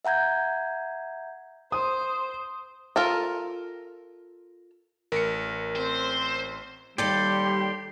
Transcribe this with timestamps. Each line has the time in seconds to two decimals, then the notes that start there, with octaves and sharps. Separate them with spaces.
0.05 E5 F#5 A#5 G6 G#6
1.72 C5 D#6
2.96 F4 A4 A#4
5.12 A1 A#4 C#7
5.76 C4 C5
6.98 D#2 G3 G4 A4 D5 C6